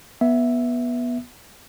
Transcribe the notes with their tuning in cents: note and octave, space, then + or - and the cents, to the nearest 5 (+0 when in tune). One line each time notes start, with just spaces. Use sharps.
B3 -20 E5 +0